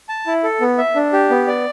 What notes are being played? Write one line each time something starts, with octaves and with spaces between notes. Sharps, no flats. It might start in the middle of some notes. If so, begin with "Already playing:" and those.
A5
E4
A4
B3
E5
D4
G4
B3
D5